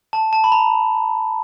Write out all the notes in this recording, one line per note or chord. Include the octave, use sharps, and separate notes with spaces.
A5
A5
B5
A#5